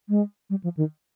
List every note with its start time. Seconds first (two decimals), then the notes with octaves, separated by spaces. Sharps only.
0.09 G#3
0.50 G3
0.64 F3
0.77 D#3